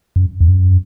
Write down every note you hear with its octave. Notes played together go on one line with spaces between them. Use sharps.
F#2
E2
F#2